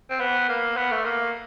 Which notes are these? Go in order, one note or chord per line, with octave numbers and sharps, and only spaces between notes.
C4
B3
A#3
B3
A3
A#3